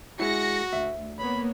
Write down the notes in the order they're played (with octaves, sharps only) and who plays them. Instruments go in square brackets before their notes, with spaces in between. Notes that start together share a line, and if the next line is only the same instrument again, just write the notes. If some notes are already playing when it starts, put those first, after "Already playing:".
[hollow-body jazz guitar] G#3 E4 [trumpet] F#4 [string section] A#6 C#7
[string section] D2 [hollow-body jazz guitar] E5
[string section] A#3 B3 C#5 [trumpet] B5